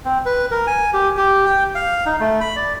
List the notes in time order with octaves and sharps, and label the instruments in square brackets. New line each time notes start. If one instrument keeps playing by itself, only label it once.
[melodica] C4
B4
A#4
G#5
G4
G4
G5
F5
D#4
A3
B5
D5